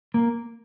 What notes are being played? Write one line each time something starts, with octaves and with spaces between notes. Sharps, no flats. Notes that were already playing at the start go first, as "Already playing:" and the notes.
A#3